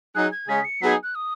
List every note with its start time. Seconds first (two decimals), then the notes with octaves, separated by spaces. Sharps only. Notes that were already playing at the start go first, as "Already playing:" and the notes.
0.15 F#3 D#4 G#4 F#6
0.32 G#6
0.48 C#3 G#3 C#4 G#4 B6
0.65 C#7
0.82 F#3 B3 D#4 G#4 B6
1.03 F#6
1.15 D#6